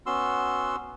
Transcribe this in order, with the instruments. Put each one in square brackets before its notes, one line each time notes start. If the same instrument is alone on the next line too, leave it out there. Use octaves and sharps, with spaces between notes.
[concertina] B3 C#4 F#4 C6 E6